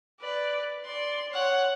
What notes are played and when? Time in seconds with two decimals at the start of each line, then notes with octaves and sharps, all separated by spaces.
0.20 B4 D5
0.85 D5 C6
1.31 C#5 F#5